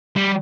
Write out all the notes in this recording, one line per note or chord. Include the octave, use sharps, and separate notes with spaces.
G3